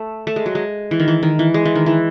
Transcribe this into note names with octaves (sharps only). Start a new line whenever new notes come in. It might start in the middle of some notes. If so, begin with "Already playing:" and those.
Already playing: A3
A3
G#3
F#3
G#3
E3
D#3
E3
D#3
E3
G#3
E3
D#3
E3